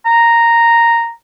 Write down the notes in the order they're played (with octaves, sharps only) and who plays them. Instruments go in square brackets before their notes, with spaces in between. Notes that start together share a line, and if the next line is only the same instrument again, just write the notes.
[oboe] A#5